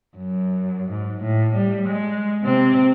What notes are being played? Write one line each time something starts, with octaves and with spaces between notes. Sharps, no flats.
F#2
G#2
A2
G3
G#3
C3 C4